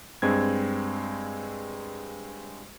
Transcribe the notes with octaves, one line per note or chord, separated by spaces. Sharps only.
G2 G#3 C4 G#6